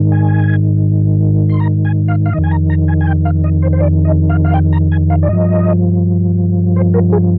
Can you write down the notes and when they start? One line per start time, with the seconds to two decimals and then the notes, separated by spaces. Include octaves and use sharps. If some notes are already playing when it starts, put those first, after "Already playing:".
Already playing: G#2 D#3
0.12 G#5
1.49 C6
1.60 A#5
1.85 G#5
2.08 F5
2.26 F5
2.33 F2 D#3 D#5
2.44 G#5
2.51 A#5
2.70 A#5
2.88 G#5
3.01 G#5
3.07 G5
3.25 F5
3.44 D#5
3.62 C5
3.73 C5
3.81 D5
4.05 D#5
4.29 F5
4.45 F5
4.54 G5
4.73 A#5
4.92 G#5
5.10 F5
5.23 D5
5.29 G2 F3 D#5
6.76 C5
6.94 A#4
7.12 G#4